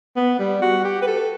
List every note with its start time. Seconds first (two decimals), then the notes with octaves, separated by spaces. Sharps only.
0.16 B3
0.39 G3
0.62 F#4
0.84 G4
1.02 B4
1.07 A4